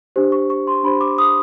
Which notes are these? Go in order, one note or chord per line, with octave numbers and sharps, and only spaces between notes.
D4 G4 C5
C#6
C#6
C6
D4 G4 C5 B5
D6
D#6